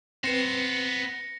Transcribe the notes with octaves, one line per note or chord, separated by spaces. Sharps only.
B3 C4 B4 C5 A#6 C#7